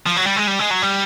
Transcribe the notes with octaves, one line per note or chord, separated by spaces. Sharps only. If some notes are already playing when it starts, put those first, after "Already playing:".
F3
F#3
G3
G#3
G3
G#3
F#3
G3